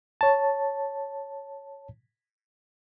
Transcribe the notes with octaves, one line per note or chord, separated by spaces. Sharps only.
C#5 A5